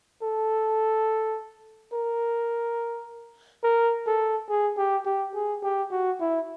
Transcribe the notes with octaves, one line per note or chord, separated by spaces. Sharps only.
A4
A#4
A#4
A4
G#4
G4
G4
G#4
G4
F#4
E4